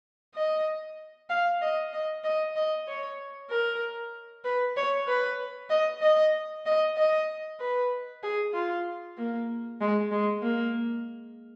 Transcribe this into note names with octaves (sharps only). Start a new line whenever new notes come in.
D#5
F5
D#5
D#5
D#5
D#5
C#5
A#4
B4
C#5
B4
D#5
D#5
D#5
D#5
B4
G#4
F4
A#3
G#3
G#3
A#3